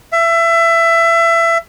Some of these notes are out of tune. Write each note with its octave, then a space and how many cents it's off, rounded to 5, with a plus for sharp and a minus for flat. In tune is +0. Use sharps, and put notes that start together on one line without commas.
E5 +25